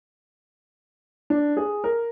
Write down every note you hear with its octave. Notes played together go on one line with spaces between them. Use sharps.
D4
G#4
A#4